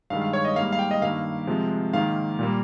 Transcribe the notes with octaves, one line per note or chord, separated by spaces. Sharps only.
G2 D#3 G#3 F5
F5
C#5
D#5
G#2 G3 A#3 F5
F5
G5
D#5
G2 D#3 A#3 F5
C3 F3 G#3
G#2 D#3 A#3 F5
A#2 G3 A#3